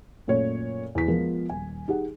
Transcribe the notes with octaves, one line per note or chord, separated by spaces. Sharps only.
F#2 A#2 A3 C#5
E2 E4 B6
F3 G#3 B3 F4 G#4 A#4
D#1 G#5
D#4 G4 G#4 F#5